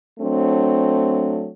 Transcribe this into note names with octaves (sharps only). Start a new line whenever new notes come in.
F#3 A3 C4 D4